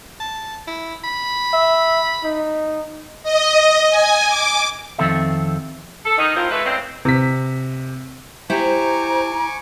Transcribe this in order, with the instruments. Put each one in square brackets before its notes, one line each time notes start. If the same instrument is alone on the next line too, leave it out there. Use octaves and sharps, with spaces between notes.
[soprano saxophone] A5
E4
B5
[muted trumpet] E5
D#4
[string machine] D#5
G#5
D6
[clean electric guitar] F2 D#3 C4 A4 E5
[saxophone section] A4
D#3 D#4
A2 D#3 F3 C4 F4 A#4
G#3 A3 B4
A2 C#3 G#3 C4
[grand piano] C3 B6
[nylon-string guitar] E4 G4 [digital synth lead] C5 [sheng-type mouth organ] G#5 C#6 D6 [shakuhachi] A#5